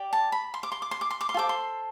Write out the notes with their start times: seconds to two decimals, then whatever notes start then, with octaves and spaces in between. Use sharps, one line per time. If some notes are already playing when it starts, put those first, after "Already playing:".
Already playing: G4 D5
0.13 A5
0.32 B5
0.54 C6
0.63 D6
0.72 C6
0.82 D6
0.91 C6
1.01 D6
1.11 C6
1.21 D6
1.29 C6
1.34 F4
1.37 A4 C5 D6
1.49 C6